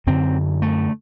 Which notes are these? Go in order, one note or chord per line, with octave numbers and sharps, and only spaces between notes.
F#2 D3 C4
A3